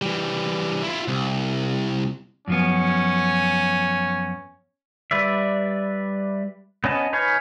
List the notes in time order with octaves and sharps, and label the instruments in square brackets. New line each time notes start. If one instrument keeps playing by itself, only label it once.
[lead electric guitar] E3 G3
E4 F4
C2
[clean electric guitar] F#2 F3 B3 [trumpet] C#4
[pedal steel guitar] G3 B4 D5 E5
B3 C#4 D#5 A5
D#4 B4 C#5 F5 G#5